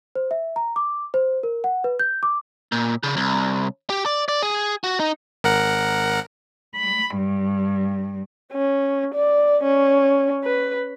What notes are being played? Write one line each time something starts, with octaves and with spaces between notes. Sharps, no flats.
C5
E5
A#5
D6
C5
A#4
F#5
B4
G6
D6
A#2
C#3
C2
G4
D5
D5
G#4
F#4
D#4
G#1 A#4 F#5
B5
G2
C#4
D5
C#4
B4